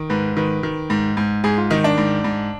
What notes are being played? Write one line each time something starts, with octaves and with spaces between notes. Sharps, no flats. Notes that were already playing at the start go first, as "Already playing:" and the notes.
Already playing: D#3
G#2 B4
D#3 B4
D#3
G#2
G#2
G#2 G#4
F4
D#3 D#4
D4
G#2
G#2